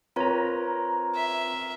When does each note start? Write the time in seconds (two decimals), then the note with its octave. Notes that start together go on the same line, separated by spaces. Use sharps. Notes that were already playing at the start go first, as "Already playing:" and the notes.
0.16 C4 F4 A#4 B4 C#5 A#5
1.16 E5